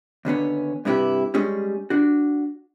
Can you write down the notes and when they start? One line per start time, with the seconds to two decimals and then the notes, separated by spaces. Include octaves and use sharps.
0.25 D#2 D3 B3 C#4
0.85 G2 C3 D#4 E4 G4 B4
1.34 G3 G#3 C#4 G#4
1.90 D4 F#4